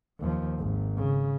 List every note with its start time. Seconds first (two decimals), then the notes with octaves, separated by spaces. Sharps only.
0.19 D#2 F3
0.58 G#1
0.97 C#3